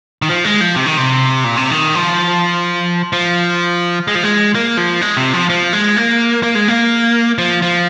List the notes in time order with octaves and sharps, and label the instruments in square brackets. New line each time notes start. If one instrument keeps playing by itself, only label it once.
[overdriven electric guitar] D#3
F3
G#3
F3
C3
D#3
C3
A#2
C3
D#3
F3
F3
G#3
F3
G#3
A#3
F3
G#3
C3
F3
F3
G#3
A#3
A#3
G#3
A#3
F3
F3